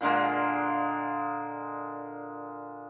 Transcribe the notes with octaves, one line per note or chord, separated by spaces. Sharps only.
A#2 D3 G#3 A#3